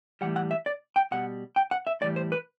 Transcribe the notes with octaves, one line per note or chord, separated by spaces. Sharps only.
A2 E3 G3 F#5
F#5
E5
D5
G5
B2 G3 F#5
G5
F#5
E5
A2 E3 G3 D5
C5
B4